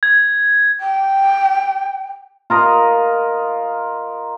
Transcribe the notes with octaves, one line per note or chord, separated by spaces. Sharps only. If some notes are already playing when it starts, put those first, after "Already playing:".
G#6
G5
F4 A#4 D#5